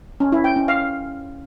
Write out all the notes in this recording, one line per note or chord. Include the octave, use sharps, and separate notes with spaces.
C#4
E4
G5
C#4
F5